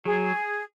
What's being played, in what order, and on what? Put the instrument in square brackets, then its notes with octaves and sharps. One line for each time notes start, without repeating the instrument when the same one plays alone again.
[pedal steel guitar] F#3 [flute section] G#4